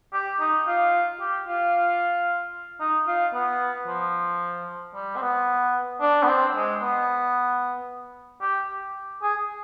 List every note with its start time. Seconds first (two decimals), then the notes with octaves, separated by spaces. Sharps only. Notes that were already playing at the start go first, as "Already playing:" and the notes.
0.13 G4
0.40 D#4
0.67 F4
1.20 G4
1.47 F4
2.80 D#4
3.07 F4
3.34 B3
3.87 F3
4.94 G3
5.16 C4
5.21 B3
6.01 D4
6.23 B3
6.27 C4
6.55 G#3
6.82 B3
8.42 G4
9.22 G#4